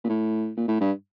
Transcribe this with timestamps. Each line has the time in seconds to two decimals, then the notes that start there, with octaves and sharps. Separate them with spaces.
0.04 A#2
0.09 A2
0.57 A#2
0.68 A2
0.80 G2